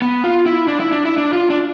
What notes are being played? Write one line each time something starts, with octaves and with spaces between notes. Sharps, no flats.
B3
F4
E4
D4
E4
D4
E4
D4
F4
D4